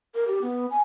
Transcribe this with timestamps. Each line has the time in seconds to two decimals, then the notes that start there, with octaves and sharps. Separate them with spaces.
0.15 A#4
0.28 G4
0.42 B3
0.71 G#5